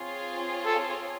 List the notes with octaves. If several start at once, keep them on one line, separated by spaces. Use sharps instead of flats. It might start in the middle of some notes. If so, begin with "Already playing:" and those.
Already playing: C4 F4 G#4 C#5
A4